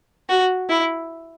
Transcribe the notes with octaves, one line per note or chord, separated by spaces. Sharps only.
F#4
E4